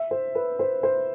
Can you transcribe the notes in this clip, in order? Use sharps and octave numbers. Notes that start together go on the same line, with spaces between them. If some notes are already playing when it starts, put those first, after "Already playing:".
Already playing: E5
C5
B4
C5
C5